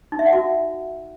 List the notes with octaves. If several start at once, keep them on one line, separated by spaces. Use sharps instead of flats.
D#4
E5
F#5
F#4